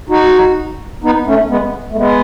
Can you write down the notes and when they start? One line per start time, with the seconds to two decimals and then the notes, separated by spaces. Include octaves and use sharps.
0.09 D#4 F#4
1.04 B3 D#4
1.27 A3 C#4
1.50 G#3 B3
1.92 A3
1.97 G#3 B3